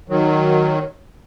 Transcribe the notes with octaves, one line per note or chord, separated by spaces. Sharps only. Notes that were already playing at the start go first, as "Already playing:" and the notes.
D#3 F#3